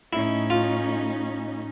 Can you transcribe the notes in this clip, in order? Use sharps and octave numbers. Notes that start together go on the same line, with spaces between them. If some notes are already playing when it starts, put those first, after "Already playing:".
A2 C#4 D#4 E4
F4